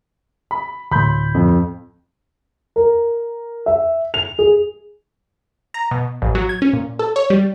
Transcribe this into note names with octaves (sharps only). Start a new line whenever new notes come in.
B5
D2 A2 B5 C6 G6
F2
A#4
E5
F7
G#4
A#5
B2
A1
F#3
G#6
C#4
A#2
A4
C#5
G3